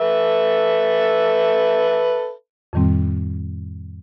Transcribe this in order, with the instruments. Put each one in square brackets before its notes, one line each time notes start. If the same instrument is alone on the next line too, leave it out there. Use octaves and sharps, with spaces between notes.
[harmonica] A4 B4 E5
[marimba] F2 A2 D#3 G3 C4